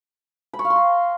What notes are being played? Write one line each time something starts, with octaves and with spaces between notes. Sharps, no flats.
B5
C#6
F5
C6
A#5